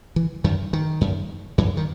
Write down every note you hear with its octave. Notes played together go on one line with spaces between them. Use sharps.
E3
F#2 D#3
D#3
F#2
F#2 E3
D#3